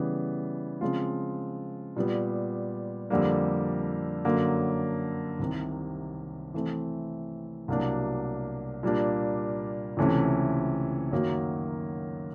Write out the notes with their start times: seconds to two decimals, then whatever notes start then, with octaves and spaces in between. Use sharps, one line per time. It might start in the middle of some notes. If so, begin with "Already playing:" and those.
Already playing: C#3 E3 G3 B3
0.81 C#3 F3 G#3 C4 F4
1.96 A#2 G3 B3
3.10 F2 D3 G3 A#3
4.25 F#2 D3 F#3 A#3
5.39 C2 C3 D#3
6.54 E3 A3 C4
7.68 C2 B2 F#3 A#3 D4
8.83 A#2 G3 A#3 D4
9.97 C#2 C3 E3 A3 C#4
11.12 F#2 D#3 F#3 A#3